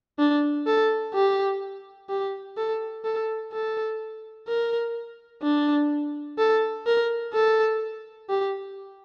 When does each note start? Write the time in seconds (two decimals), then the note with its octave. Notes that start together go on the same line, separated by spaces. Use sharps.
0.19 D4
0.67 A4
1.14 G4
2.10 G4
2.58 A4
3.04 A4
3.53 A4
4.48 A#4
5.43 D4
6.38 A4
6.87 A#4
7.34 A4
8.30 G4